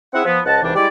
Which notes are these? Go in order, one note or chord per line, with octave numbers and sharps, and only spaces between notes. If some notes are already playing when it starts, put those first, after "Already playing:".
C4 E4 G#4 E5 F#5
F3 B3
C#2 F3 D#5 F#5 A5
C2 G#2 E3 G3 D4
G3 G#3 E4 D5